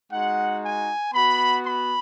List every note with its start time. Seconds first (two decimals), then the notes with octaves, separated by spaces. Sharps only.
0.11 G#3 D#4 F#4 F#5
0.63 G#5
1.13 B3 F#4 B5
1.65 B5